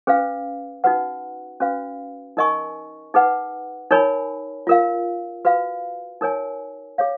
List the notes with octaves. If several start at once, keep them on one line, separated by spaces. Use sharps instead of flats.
C#4 G#4 B4 F5
D#4 F#4 B4 F#5
C#4 F#4 B4 F5
D#4 A#4 D#5 G#5 C#6
D#4 G#4 B4 F#5
D#4 A#4 C#5 G#5 B5
F4 A#4 F5
F#4 B4 F5
D#4 A#4 C#5 G#5
G#4 C#5 F5